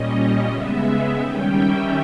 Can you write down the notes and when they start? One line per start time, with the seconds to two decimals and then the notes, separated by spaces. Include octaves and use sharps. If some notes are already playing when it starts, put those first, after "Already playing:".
Already playing: A#2 G3 C#4 D#5
0.47 C#3 G#3 B3 E5
1.18 D#3 G3 C#4 G5
1.53 E5